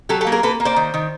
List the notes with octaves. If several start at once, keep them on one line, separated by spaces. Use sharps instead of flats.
F#3 G4 A4
G4 A4
A#3
G#4 A#4
A#3 A4 B4
A#3
C5 D5
D#3
D#3